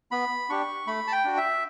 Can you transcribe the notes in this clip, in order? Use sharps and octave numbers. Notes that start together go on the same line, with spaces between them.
B3 B5
D4 G4 C#6
A3 B5
A5
G5
D4 F#4
E5